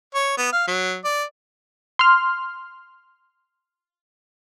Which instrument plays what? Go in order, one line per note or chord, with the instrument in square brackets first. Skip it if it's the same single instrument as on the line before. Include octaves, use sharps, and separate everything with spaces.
[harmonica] C#5
B3
F5
F#3
D5
[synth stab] C6 F6